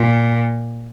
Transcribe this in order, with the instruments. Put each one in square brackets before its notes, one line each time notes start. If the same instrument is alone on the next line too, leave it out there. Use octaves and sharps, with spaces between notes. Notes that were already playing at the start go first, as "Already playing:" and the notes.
Already playing: [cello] A#2